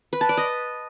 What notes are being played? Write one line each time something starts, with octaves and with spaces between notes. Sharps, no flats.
B4
A5
D5
D#5